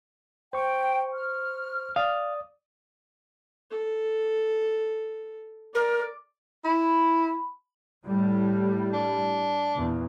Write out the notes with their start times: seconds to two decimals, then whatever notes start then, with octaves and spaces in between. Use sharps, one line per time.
0.53 C5 G5 C#6
1.14 F6
1.96 D5 F5 D#6
3.71 A4
5.74 A#4 D5
6.65 E4 B5
8.06 A2 G3
8.93 D4
9.74 E2 A#2